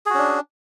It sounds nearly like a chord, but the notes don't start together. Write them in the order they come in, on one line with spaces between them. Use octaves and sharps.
G#4 F#4 C#4 D4